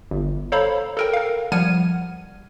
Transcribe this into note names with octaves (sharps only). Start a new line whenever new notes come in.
G1
A4 C5 C#5 F5 A#5 B5
A4 A#4 G5
A#4 F5
F3 G3 F#5 F6 G#6 D#7